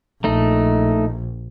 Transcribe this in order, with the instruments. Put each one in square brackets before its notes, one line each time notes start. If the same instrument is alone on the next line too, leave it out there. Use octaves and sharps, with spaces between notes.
[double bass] A#1 [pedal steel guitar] A3 D#4